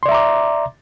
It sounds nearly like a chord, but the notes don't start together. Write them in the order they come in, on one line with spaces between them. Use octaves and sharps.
C6 D5 E5 A#5 D6